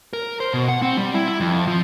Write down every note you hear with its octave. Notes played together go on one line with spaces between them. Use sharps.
A#4
C5
B2
F#5
C4
G3
E4
E4
F2
F3